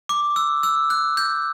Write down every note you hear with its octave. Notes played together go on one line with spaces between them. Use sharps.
D6
E6
E6
F#6
G6